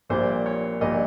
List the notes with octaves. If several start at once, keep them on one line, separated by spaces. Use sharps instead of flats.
A#1 A#2 G3 C5
C#5
A#1 A#2 G3 D#5